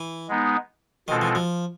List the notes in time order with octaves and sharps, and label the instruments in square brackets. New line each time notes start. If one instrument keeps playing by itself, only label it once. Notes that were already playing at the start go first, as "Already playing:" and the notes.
Already playing: [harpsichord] E3
[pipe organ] G#3 B3 D#4
[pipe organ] B2 G#3 C4 F4 A4 [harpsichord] D#3
[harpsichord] E3
F3